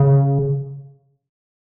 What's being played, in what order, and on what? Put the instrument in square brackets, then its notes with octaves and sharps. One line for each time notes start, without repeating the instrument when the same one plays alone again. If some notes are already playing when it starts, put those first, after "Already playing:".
Already playing: [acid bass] C#3